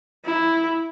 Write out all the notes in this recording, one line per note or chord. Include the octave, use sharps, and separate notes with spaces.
E4